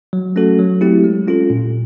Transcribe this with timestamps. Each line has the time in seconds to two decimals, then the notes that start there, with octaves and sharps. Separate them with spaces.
0.13 F#3
0.36 A3 C#4 F#4 A4
0.59 F#3
0.81 A3 C4 E4 G4
1.04 G#3
1.28 C#4 F4 A4
1.50 A#2